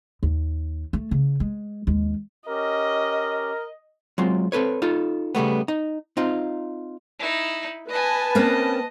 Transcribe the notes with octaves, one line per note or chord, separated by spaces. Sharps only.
D#2
A3
C#3
G#3
D#2 G#3
C#4 G4 A#4 D#5
F#3 G#3 C4 F4
C4 A4 B4 C#5
D#4 F4 A4
C#3 G3 A3 B3
D#4
C4 D#4 F4
D#4 E4
B4 D#5 G#5 A5
A#3 C4 C#4 D#5